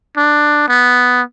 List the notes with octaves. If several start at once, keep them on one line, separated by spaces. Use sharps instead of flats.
D4
B3